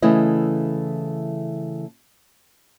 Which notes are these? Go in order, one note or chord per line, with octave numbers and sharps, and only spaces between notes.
C#3 E3 A3 E4 D#5